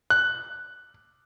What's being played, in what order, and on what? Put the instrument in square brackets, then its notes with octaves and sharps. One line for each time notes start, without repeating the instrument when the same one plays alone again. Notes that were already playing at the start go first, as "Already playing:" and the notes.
[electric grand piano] F#6